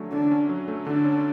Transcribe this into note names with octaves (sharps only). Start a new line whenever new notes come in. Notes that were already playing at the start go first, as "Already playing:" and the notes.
Already playing: D3 F#3 A3 C#4
D3 D4
C#4
F#3
A3
D3 D4
C#4